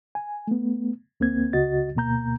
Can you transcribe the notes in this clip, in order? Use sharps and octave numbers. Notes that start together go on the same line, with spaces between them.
G#5
A3 B3
D2 A#3 C4 G#6
C#2 C#3 F#4 D#5 A6
D2 B2 A#3 A#5 G6